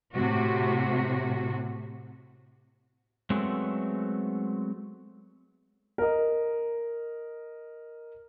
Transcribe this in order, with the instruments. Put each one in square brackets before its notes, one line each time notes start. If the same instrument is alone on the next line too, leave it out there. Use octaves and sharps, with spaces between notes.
[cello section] A2 C3 F#4
[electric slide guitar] F#3 G#3 A3 B3 C4
[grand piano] A#4 D#5